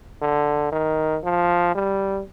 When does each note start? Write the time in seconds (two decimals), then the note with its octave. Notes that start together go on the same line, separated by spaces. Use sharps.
0.22 D3
0.72 D#3
1.24 F3
1.75 G3